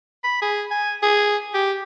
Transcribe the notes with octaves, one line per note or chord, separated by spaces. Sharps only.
B5
G#4
G#5
G#4
G4